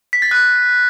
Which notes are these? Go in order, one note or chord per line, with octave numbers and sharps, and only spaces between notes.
B6
A6
F#6